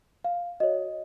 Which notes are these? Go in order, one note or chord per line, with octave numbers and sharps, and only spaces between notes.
F5
F#4 C#5 D#5